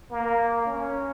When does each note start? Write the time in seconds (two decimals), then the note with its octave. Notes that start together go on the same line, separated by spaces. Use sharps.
0.11 A#3
0.66 C#4